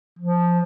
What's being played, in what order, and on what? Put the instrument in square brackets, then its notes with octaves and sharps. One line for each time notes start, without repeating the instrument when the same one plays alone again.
[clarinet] F3